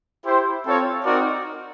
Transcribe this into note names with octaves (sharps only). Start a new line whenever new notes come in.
E4 G4 C5
C4 F4 A4 C#5
C4 D#4 F#4 A#4 D5